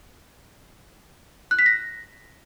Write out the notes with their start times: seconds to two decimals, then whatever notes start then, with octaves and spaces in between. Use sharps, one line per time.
1.51 F#6
1.59 B6
1.66 A#6